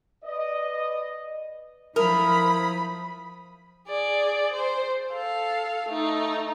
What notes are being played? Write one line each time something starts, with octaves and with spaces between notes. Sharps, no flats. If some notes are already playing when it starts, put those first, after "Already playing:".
B4 D5 D#5
F3 E4 A#4 B5 D#6
G#4 D5
C5
A4 F5
A3 D#4